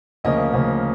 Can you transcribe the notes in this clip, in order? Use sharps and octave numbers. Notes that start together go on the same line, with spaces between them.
D2 C#3 F3 A#3 C#4 D#5
D2 C#3 F3 A#3 C#4